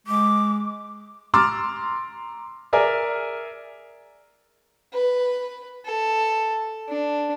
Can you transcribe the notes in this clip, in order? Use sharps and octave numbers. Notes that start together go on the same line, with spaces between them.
G#3 D6
A#5 C6 D6 E6 F6 A6
G#4 A#4 D5 E5 G#5
B4
A4
D4